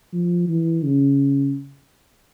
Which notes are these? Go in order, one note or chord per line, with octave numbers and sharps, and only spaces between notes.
F3
E3
C#3